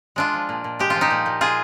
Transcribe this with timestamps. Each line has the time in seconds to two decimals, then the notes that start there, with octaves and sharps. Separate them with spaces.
0.16 G#3 D4 F4
0.34 F3
0.49 A#2
0.64 A#2
0.79 G#3 G4
0.90 F4
0.95 F3
1.01 D#4 G4
1.11 A#2
1.26 A#2
1.41 G#3 F4 G#4